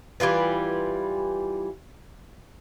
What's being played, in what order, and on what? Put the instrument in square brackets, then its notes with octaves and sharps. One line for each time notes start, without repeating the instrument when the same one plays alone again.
[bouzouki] E3 G3 F4 B4